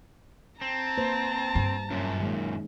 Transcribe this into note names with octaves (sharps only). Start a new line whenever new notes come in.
C4 A5 A#5
A#3 B4 C5
G2
F#2 A#2 C#4
D#3 G#3 A#3